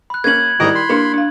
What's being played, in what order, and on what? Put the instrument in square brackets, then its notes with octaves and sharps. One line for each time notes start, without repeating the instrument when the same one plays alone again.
[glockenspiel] B5 F#6
[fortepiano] A#3 C#4 [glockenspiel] G#6 F#7
[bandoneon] G#2 D#5 A#5 [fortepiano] D#3 G3 [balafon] E4
[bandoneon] B5 C6
[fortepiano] A#3 [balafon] D4 G4
[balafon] D4 F5